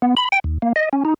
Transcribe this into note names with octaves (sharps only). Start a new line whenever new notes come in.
B3
B5
G5
D#2
A#3
D#5
C#4
D#4